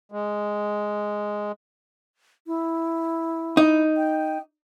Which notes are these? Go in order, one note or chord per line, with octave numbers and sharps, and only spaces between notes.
G#3
E4
D#4
G5